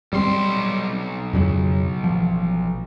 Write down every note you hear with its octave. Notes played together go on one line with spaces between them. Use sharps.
B1 G3 C4 C6
F2 C#3 F#3
A1 F3